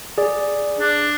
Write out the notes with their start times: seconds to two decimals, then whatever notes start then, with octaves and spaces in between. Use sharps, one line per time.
0.18 G#4 D5
0.79 D4